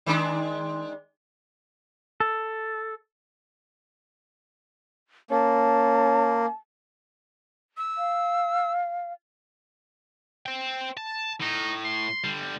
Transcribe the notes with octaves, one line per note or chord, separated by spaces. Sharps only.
D#3 G#3 D4
A4
A#3 C#4 A5
E6
F5
C5 G5
A5
A2 D#4
C6
D3 G3